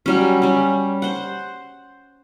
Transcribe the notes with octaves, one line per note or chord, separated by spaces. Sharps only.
F#3 G3 C#4
G3 C#4
C5 F#5